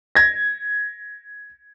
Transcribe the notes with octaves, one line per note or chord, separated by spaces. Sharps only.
G#6 A#6